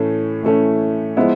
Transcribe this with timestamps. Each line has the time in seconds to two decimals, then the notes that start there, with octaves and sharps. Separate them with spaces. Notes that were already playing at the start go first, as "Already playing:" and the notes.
Already playing: A2 E3 A3 C#4
0.43 A2 E3 A3 C#4
1.17 F3 G#3 B3 E4